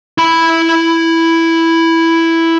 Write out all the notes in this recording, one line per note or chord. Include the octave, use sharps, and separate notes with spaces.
E4 B5